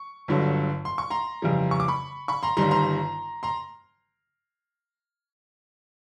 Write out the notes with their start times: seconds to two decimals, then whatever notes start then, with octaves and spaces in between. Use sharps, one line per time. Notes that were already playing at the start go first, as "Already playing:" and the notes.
Already playing: C#6
0.28 G1 G2 D3 F#3
0.85 C6
0.98 C#6
1.10 A#5 C6
1.42 F2 C#3 E3 G3
1.71 C#6
1.80 D6
1.88 B5 C#6
2.28 B5 C#6
2.43 A#5 C6
2.57 G1 G2 D#3 G3 A#5 C6
2.71 A#5 C6
3.43 A#5 C6